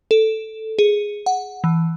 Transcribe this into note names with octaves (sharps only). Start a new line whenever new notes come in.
A4
G#4
F#5
E3